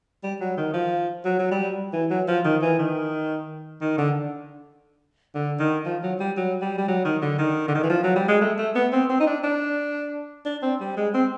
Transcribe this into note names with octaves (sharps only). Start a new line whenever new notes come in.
G3
F#3
D#3
F3
F#3
F#3
G3
E3
F#3
F3
D#3
E3
D#3
D#3
D3
D3
D#3
F3
F#3
G3
F#3
G3
G3
F#3
D#3
D3
D#3
D3
D#3
E3
F3
F#3
G3
G#3
A3
A3
B3
C4
C4
D#4
D4
D4
D4
C4
G3
G#3
C4